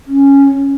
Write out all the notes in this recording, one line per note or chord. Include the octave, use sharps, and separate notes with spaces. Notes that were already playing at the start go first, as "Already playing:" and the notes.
C#4